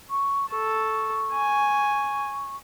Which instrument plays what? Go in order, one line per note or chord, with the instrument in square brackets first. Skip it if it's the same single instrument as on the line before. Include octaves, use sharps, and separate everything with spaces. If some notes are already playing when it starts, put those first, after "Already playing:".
[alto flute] C#6
[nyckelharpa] A4 [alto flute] C#6
[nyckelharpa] G#5